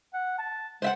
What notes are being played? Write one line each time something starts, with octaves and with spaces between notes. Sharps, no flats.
F#5
A5
G#3 C5 E5 F#5